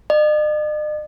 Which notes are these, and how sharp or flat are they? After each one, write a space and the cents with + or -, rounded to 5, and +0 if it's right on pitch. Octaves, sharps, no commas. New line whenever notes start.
D#5 -45